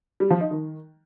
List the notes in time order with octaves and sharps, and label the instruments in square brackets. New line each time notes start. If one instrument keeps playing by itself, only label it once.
[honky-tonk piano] G3
F3
D#4
D#3